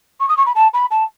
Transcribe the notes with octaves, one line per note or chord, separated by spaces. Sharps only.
C#6
D#6
C#6
B5
A5
B5
A5